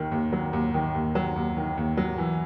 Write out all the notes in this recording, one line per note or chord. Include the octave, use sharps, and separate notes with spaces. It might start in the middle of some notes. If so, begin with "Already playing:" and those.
Already playing: D#2 D#3
D#2
F#3
D#2
D#3
D#2
F#3
D#2
D#3
D#2
F#3
E3